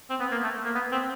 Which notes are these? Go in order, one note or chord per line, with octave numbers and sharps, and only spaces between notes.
C4
B3
A#3
A3
A#3
B3
C4